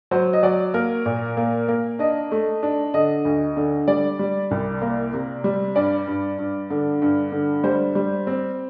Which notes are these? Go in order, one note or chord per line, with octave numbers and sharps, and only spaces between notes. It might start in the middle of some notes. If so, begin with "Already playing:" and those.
F#3 C5
D#5
F#3 D5
A#3 A#4
A#2
A#3
A#3
D4 D#5
A3
D4
D3 D#5
D2
D3
G3 D5
G3
C2
A#3
C3
G3
G2 D5
G2
G2
D3
G2
D3
G3 C5
G3
C4